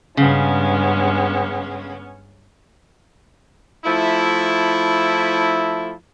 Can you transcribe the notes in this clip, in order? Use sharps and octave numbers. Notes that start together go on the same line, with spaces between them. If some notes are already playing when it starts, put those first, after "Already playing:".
G2 C#3 G#3 B3 C#4
F3 A3 E4